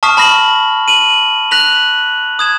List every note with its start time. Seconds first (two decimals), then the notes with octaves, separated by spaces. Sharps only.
0.03 A5 C#6 D#6 F6 B6 C7
0.17 A5 B5 F6 A#6 C7 F#7
0.88 D#7 F#7
1.51 F#6 A#6 B6 F7 F#7
2.39 D#6 G#6 E7